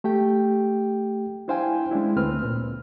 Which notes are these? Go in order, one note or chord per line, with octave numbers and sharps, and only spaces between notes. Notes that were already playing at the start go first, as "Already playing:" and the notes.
A3 G4 G5
D4 E4 C5 F5 G5 G#5
G#3 C#4 D4 E4
D2 A3 C4 B4 F6
A#2